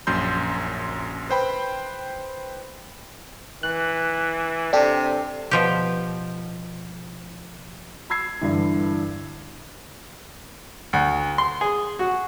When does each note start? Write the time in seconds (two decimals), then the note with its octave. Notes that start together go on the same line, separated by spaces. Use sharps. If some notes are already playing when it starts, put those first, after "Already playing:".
0.07 A#1 F#2 C6 G6
1.30 B4 C5 G5 B5
3.63 E3 F#6
4.73 C3 D4 G4 A4
5.51 B2 F3 G4
8.10 B5 E6 G#6 C7
8.41 G2 D3 E3
10.93 D2
11.38 C6
11.61 G#4
11.99 F#4